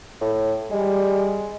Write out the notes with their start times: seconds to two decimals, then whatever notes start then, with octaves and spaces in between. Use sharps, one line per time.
0.21 A2
0.71 G3 G#3